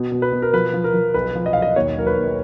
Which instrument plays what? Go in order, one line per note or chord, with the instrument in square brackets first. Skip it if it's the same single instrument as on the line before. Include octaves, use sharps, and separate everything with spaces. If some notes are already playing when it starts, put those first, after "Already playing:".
Already playing: [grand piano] B2
B2
B4
B2
A#4
F3 B4
F3
A#4
F3
B1 B4
F3
D#5
B1 F5
D#5
D#2 C#5
F#3 A#4
B4
D#2